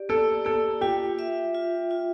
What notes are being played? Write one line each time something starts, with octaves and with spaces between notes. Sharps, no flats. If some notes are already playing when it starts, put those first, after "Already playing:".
Already playing: G4 D5
A#3 A4
A#3 A4
F4 G4
E5
F4
F4